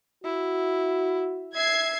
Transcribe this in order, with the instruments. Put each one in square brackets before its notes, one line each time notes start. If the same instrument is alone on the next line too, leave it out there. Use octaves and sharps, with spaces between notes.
[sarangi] E4 [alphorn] F#4
[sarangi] E5 [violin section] G#6 C7